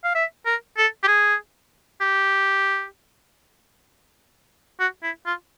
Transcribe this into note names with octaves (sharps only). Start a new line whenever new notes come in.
F5
E5
A#4
A4
G4
G#4
G4
F#4
E4
F4